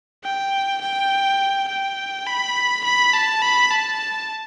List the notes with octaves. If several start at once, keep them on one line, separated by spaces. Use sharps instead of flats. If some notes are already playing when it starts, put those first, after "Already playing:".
G5
G5
G5
B5
B5
A5
B5
A5